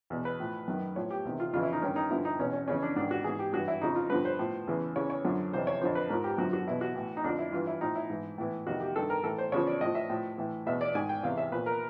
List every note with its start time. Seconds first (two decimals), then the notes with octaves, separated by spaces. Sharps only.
0.10 E2 B2
0.25 B4
0.40 A2 F3
0.68 F#2 D#3
0.96 A2 F3 C#5
1.11 G4
1.25 E2 C3 D#3
1.40 F4
1.53 F2 C#3 E3 F4
1.63 E4
1.73 D#4
1.82 G2 D#3 C#4
1.96 D#4
2.11 G2 D3 F3 E4
2.25 D#4
2.39 E2 B2 C#4
2.53 C#4
2.68 F2 C#3 E3 C#4
2.83 D4
2.96 G#2 D#3 D4
3.11 F#4
3.24 G#2 E3 G#4
3.39 G4
3.53 G2 E3 F#4
3.68 E4
3.81 F2 C#3 F3 D#4
3.95 F4
4.10 G2 D3 F3 B4
4.25 C5
4.39 A2 F3
4.67 E2 C#3 E3
4.96 E2 C#3 E3 C#5
5.10 C#5
5.25 F#2 D3 F3
5.53 F2 C3 E3 C5
5.67 C#5
5.81 F2 D3 F3 C5
5.95 B4
6.10 G#2 F3 A#4
6.24 G4
6.38 F#2 D3 F3 F#4
6.53 F#4
6.67 E2 B2 E4
6.81 F#4
6.95 A2 E3
7.17 D#4
7.24 F2 D3 F3 D4
7.38 E4
7.53 G2 E3 F4
7.67 E4
7.81 A2 F3 D#4
7.95 E4
8.10 G#2 E3
8.38 A2 E3
8.67 F2 C3 D#3 F#4
8.80 G4
8.96 G2 D#3 A4
9.10 A#4
9.24 A2 E3 A4
9.38 C5
9.52 E2 C#3 F3 C#5
9.67 D5
9.81 A2 F3 D#5
9.95 E5
10.09 A2 F3
10.38 A2 E3
10.66 E2 B2 E5
10.81 D5
10.95 G#2 D#3 G#5
11.09 G5
11.23 E2 C3 E3 F5
11.38 E5
11.52 A#2 F3 B4
11.66 A#4